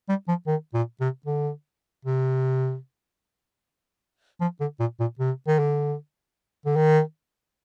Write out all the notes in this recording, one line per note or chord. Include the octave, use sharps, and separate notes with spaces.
G3
F3
D#3
A#2
C3
D3
C3
F3
D3
A#2
A#2
C3
D#3
D3
D3
D#3